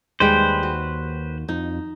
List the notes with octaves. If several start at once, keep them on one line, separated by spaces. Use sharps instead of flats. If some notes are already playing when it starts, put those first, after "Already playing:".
D#2 G3 G#3 B4 C5 G5
F#4
F2 D#4